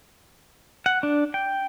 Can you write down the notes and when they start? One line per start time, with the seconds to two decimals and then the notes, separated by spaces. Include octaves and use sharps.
0.86 F#5
1.03 D4
1.34 G5